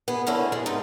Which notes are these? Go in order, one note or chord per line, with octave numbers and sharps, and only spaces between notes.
B3 G#4
F2 D3 C#4 E4
G#3 A3
G#2 A3 D#4